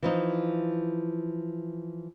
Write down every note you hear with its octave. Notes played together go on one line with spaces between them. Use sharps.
E3 F3 D#4